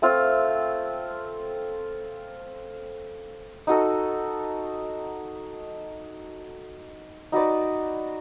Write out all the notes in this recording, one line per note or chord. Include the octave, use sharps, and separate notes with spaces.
A3 C4 F4
D#4 F#4 A4
D#4 F#4 B4 D5